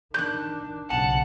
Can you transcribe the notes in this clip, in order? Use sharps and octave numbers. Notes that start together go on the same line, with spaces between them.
D#3 D4 F#6 G6
B1 C#3 F#5 A5